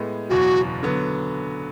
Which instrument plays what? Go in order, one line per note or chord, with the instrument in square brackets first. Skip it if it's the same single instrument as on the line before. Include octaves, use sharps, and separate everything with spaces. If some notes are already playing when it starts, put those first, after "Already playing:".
Already playing: [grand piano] A2 G#3 B3
[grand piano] F#1 E2 B2 F#3 [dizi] F#4
[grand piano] D3 F#3 B3